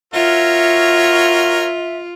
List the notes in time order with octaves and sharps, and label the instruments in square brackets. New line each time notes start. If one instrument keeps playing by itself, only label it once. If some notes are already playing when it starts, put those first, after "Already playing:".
[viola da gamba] F4 [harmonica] F#4 A#4 C#5 [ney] E5